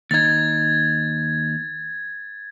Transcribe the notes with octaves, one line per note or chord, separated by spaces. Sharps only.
D#2 D#4 G#6 A6